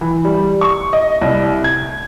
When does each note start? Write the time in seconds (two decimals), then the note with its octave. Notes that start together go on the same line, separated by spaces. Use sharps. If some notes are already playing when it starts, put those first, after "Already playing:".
0.01 E3
0.25 G3
0.61 C#6
0.93 D#5
1.21 C2
1.64 G#6